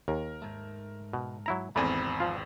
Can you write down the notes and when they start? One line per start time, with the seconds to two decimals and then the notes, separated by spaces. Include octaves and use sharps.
0.08 D#2 A#4
0.42 G#2 A3
1.13 B2
1.46 F#3 E4 A#5
1.76 G#1 E2 A3 C4 D5 G#5 B5
2.20 F3 F4